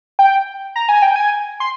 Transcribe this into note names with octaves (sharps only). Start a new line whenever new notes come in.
G5
A#5
G#5
G5
G#5
C6